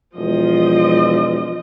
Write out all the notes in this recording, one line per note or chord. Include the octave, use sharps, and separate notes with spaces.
E1 F3 D#5